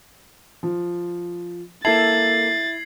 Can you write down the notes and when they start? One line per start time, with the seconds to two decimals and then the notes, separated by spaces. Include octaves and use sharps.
0.63 F3
1.85 A#3 E4 A4 A5 G#6 A6 C7 F#7